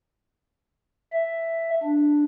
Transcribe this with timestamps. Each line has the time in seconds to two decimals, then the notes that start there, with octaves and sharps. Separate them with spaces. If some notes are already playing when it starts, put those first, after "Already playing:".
1.13 E5
1.83 D4